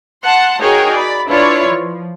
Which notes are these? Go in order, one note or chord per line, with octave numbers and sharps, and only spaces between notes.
F#5 A5 C6
D#4 F#4 G#4 A#4 C#5 G5
D5 B5
D4 E4 F4 B4 C#5 D5
F3